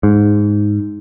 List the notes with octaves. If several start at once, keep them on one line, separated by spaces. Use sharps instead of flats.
G#2